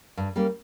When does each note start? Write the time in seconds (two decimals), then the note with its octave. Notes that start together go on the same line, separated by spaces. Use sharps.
0.17 G2
0.36 G3 A#3 C#4 G4